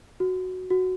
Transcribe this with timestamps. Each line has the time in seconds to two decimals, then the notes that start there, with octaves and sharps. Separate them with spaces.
0.20 F#4
0.70 F#4